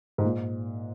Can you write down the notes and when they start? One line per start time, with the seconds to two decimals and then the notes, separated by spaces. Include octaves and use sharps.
0.18 G#2
0.24 A#2